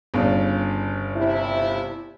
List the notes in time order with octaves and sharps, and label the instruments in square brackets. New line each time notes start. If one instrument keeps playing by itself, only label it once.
[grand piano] G1 C#3 D4
[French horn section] C3 E4